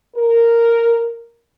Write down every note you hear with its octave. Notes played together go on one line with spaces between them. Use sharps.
A#4